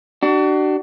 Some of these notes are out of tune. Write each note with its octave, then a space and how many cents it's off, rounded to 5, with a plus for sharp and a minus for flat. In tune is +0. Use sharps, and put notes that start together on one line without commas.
D4 +25 F#4 +40